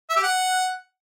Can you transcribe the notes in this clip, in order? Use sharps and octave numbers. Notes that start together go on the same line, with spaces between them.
E5
G4
F#5